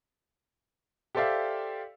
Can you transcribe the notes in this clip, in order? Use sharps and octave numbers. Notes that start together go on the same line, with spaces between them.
G4 A4 C5 D5 E5 F5